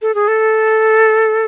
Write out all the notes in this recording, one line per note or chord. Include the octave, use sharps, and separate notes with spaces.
A4
G#4
A4